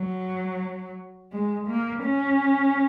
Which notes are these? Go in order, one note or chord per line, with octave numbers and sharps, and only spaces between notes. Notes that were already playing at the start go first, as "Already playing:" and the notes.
Already playing: F#3
G#3
A#3
C#4